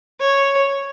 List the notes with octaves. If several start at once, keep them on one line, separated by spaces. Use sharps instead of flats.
C#5